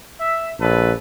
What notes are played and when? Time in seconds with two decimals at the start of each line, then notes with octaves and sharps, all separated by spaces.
0.18 E5
0.59 A#1 A4 B4